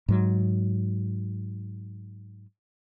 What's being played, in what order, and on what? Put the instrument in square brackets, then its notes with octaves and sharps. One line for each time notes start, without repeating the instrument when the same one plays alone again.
[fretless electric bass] G#2 F#3